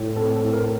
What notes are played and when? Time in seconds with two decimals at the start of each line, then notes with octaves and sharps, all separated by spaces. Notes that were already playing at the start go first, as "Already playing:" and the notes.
Already playing: A2
0.16 C4 A4
0.35 A4
0.41 A2
0.53 A#4